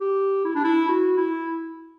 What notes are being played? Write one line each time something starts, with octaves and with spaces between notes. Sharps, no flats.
G4
E4
D4
E4
F#4
E4